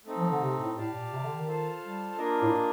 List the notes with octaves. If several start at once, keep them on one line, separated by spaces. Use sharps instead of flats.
A3 C4 D#4
F3
D3
C3
A2
A2 G4 D5 F5 A5
A#2
C3
D3
D#3
F4 A4 C5 F5 A5
G3
A#3 D4 F4 A#4 D#5
A2